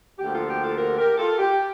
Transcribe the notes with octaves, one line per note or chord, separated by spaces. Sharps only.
D2 D3 F3 A#3 G4
F4 A4
G4
F4 A4
G4 A#4
G4 A#4
F4 A4
G4